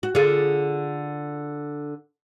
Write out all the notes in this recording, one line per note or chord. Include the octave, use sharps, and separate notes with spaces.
F#4
D3 F4 G#4